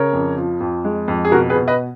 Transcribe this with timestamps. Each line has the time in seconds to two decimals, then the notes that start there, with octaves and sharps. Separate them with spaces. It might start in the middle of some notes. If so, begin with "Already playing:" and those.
Already playing: C#3 A#4 C#5
0.13 F2
0.37 F3
0.60 F2
0.84 G#3
1.08 F2
1.25 G#4
1.32 B2 F#4 A#4
1.50 G#4 B4
1.56 B2
1.68 B4 D#5